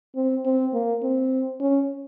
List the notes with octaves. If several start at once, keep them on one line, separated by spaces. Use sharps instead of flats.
C4
C4
A#3
C4
C#4